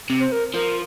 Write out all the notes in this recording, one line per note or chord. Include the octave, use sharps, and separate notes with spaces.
C3
C5
A#4
F3 A#4